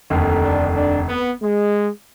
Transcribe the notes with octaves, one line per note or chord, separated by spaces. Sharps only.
F1 D#2 D3
D4
D4
B3
G#3